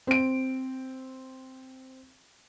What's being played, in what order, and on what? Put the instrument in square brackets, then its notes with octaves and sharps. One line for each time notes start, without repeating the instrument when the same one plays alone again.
[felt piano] C4 D7